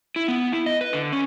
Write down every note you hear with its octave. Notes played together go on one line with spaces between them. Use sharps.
E4
B3
E4
D#5
B4
D3
C#4